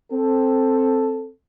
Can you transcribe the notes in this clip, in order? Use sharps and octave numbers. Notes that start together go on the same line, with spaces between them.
C4 A4